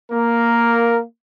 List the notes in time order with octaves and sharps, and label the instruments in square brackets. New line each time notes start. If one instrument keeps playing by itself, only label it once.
[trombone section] A#3 [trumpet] A#4